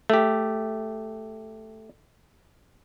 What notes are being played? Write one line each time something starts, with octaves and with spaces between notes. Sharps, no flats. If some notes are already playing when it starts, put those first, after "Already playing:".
A3 G4